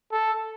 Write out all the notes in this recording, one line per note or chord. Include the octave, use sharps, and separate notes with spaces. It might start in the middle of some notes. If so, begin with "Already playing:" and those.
A4